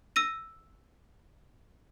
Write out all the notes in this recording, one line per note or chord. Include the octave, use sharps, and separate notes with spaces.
E6 A#6 D#7